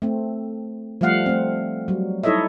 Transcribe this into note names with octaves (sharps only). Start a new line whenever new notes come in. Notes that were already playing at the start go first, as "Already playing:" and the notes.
A3 C4
F3 G3 A3 F5 F#5
A3 C4
F#3 G3
D#4 E4 A4 C#5 D#5 E5